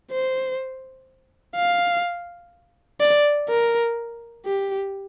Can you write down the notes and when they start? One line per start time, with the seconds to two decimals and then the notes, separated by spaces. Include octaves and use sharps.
0.11 C5
1.56 F5
3.01 D5
3.49 A#4
4.46 G4